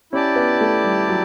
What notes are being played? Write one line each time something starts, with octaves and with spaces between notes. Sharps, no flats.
C#4 E4 G4 D5 A5
B3
A3
G3
F#3